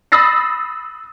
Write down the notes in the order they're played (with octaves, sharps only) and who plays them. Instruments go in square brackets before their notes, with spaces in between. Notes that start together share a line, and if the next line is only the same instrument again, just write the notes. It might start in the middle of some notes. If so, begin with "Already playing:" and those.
[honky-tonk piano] B5 D#6 E6 A6 A#6 C7